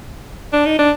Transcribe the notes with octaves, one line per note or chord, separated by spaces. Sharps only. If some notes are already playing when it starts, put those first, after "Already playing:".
D4
D#4
D4